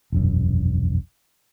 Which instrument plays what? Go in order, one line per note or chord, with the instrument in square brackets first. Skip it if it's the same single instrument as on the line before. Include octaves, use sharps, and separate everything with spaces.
[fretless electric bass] E1 A#1 F#2